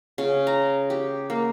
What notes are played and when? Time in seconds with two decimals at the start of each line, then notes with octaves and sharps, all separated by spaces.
0.18 C#3
0.47 A#5
0.90 G4
1.30 A#3